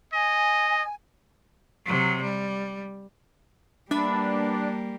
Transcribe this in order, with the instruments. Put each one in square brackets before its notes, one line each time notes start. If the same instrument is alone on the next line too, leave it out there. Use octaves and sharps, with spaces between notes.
[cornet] D#5 [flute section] G#5
[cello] C3 F#3
G3
[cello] G3 A#3 [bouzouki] B3 B4 E5 [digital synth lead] D4